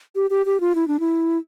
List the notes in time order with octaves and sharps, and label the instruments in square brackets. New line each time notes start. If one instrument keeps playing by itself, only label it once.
[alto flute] G4
G4
G4
F4
E4
D4
E4